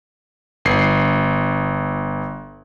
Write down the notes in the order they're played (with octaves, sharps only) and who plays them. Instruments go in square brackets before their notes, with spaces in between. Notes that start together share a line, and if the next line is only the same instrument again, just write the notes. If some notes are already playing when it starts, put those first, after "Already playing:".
[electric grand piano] G1 C7